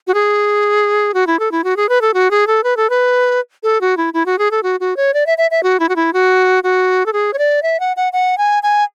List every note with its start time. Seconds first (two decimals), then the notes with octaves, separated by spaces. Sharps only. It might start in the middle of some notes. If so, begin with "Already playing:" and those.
0.07 F#4
0.14 G#4
1.14 F#4
1.27 E4
1.39 A4
1.52 E4
1.64 F#4
1.77 G#4
1.89 B4
2.01 A4
2.14 F#4
2.31 G#4
2.47 A4
2.64 B4
2.77 A4
2.90 B4
3.63 A4
3.81 F#4
3.97 E4
4.14 E4
4.26 F#4
4.39 G#4
4.51 A4
4.63 F#4
4.80 F#4
4.97 C#5
5.14 D5
5.27 E5
5.38 E5
5.51 E5
5.63 F#4
5.80 E4
5.89 F#4
5.96 E4
6.13 F#4
6.64 F#4
7.06 A4
7.13 G#4
7.33 C#5
7.38 D5
7.63 E5
7.80 F#5
7.97 F#5
8.13 F#5
8.38 G#5
8.63 G#5